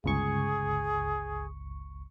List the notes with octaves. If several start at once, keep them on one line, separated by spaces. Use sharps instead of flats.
G1 C#2 G#4 C#6